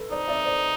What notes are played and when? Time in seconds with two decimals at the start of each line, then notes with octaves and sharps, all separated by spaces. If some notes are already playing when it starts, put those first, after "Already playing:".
Already playing: A4 B4
0.11 D#4 C5 D5
0.28 D5 E5
0.45 C5 D5